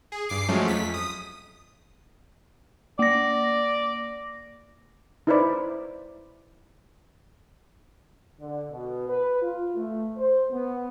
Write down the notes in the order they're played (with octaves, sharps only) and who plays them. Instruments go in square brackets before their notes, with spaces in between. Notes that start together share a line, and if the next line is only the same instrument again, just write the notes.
[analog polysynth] G#4
G2 D6 C7
F3 F#3 G#3 A3 C#4
F2 B6
D#6
[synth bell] A#3 A#6 [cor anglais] D5
[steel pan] D#4 E4 B4 C5 D5 B5
[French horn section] D3
B2
B4
F4
A3
C5
B3